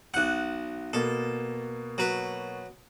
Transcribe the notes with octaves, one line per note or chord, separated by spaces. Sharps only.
B1 F#5 F#6
B2 A#3 A4
F#3 B4